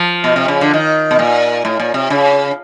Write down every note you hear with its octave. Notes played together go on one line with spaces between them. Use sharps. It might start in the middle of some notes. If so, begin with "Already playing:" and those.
Already playing: F3
B2
C3
C#3
D3
D#3
B2
A#2
A2
A#2
C3
C#3